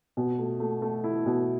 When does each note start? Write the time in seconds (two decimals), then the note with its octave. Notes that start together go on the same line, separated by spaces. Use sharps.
0.17 B2
0.38 A3
0.60 A3
0.82 A3
1.04 E4
1.26 B2